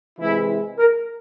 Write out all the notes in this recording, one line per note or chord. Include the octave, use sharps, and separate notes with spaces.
C3 E3 G#3 E4
A#4